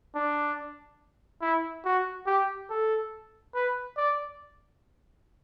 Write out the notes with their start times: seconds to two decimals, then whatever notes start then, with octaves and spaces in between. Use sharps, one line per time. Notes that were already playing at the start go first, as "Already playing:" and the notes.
0.15 D4
1.42 E4
1.85 F#4
2.27 G4
2.70 A4
3.55 B4
3.97 D5